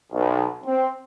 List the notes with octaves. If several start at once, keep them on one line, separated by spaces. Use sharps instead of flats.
B1
C4